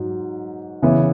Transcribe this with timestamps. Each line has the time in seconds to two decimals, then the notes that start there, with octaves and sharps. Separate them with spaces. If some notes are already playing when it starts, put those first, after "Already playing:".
Already playing: G#2 F#3
0.82 C#3 E3 B3 E4